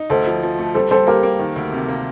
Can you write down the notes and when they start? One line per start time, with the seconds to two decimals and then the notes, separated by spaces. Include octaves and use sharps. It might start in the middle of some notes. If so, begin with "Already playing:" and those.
Already playing: D#4
0.10 D2 A4 C5
0.27 F3
0.43 F3
0.59 A3
0.75 G3 A4 C5
0.91 G3 A4 C5
1.07 A#3 G4 A#4
1.23 A#3
1.39 D#3
1.56 D2
1.72 C3
1.88 A#3